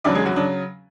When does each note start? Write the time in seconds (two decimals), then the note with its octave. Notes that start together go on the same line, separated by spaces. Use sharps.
0.04 E2 C#3 F#3 D4 D5
0.15 G#3 G#4
0.25 F#3 F#4
0.36 C#3 F#3 D4